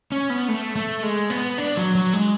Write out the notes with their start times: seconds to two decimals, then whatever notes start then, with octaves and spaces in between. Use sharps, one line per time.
0.12 C#4
0.30 B3
0.48 A3
0.76 A3
1.03 G#3
1.30 B3
1.58 D4
1.77 F#3
1.95 F#3
2.13 G#3